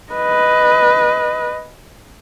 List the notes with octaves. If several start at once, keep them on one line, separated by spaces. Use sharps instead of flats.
B4 D#5